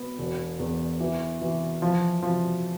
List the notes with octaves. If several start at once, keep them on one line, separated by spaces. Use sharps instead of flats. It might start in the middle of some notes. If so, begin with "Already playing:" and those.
Already playing: B3
E1
E2
E3
E3
F3
F3